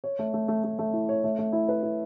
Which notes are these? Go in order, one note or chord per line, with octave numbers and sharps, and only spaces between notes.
C#5
A3
A3
A3
A3
A3
E4
C#5
A3
A3
E4
B4
E4